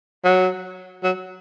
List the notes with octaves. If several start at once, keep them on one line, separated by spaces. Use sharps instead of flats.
F#3
F#3